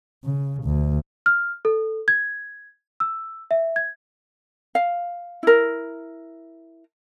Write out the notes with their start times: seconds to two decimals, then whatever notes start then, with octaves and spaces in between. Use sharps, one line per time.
0.24 C#3
0.63 D2
1.26 F6
1.65 A4
2.08 G#6
3.00 E6
3.51 E5
3.76 G#6
4.75 F5
5.43 E4 A#4